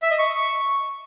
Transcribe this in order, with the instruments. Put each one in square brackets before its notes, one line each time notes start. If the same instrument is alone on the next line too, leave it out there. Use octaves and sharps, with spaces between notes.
[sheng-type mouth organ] E5
D#5
C#6